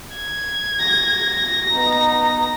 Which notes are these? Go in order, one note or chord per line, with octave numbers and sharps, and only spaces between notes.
G#6
A#6
B3 D#4 A#5